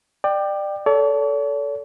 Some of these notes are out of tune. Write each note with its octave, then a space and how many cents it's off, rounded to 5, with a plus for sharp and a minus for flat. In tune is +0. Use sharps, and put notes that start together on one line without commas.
D5 +25 G5 +0
A4 +0 C#5 +45